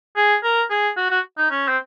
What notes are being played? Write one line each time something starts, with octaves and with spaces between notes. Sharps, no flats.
G#4
A#4
G#4
F#4
F#4
D#4
C#4
C4